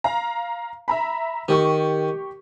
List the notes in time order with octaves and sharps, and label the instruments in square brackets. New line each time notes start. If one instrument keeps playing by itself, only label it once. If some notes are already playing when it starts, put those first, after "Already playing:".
[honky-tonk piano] F5 A#5
E5 A#5 B5
[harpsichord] D#3 [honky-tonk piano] G4 C#6